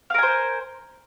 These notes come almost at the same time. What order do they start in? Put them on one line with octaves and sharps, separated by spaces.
F5 A#4 G#5 C5